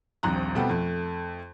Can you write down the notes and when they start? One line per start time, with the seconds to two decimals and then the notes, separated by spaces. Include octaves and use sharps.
0.23 D#1 A#1 C4 A#5 F#6
0.55 B2 G3 A3 B3 C4
0.69 F2 A3